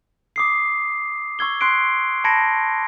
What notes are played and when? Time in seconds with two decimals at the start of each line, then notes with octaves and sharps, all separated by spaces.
0.36 D6 D#6 C7
1.39 C#6 E6 G#6 G7
1.61 C6 F#6 C7 D7
2.24 A5 B5 G#6 A#6 C#7 D7